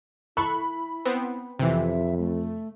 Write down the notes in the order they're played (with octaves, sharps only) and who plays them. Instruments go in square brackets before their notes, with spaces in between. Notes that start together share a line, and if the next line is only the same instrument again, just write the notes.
[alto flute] E4 [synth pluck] A4 C#6 F#6 [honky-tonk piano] B5
[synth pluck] B3 C4
[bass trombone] F2 [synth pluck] C3 E3 [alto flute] E5
[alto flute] A3